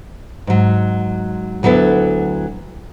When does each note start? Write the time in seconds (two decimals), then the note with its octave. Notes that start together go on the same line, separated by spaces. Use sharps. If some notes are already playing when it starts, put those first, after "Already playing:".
0.47 G#2 F#3
1.63 D2 F#3 B3 E4 A4